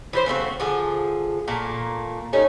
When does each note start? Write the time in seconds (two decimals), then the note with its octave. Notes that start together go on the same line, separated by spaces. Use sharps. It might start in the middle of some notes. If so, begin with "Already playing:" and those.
0.13 E3 G4 C5
0.26 C#3 A3 C4 F#4
0.60 D3 F3 G#4
1.48 A#2 A3 A#3
2.33 G3 A3 C#4 D#4